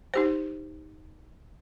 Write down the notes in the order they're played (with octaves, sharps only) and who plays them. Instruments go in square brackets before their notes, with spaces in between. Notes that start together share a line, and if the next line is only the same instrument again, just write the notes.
[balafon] D#4 G4 C5